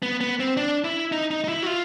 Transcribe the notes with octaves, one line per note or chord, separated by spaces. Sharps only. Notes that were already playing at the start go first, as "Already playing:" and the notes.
B3
B3
C4
D4
E4
D#4
D#4
D#4
E4
F#4
F4